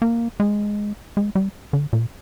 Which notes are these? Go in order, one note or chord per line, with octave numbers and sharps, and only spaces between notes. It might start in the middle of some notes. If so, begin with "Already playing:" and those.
A#3
G#3
G#3
G3
D3
A#2